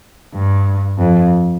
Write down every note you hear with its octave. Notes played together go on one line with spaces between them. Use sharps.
G2
F2